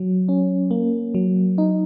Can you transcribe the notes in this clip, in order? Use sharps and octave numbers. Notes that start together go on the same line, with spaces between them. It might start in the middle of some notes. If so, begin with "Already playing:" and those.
Already playing: F#3
C#4
A#3
F#3
D#4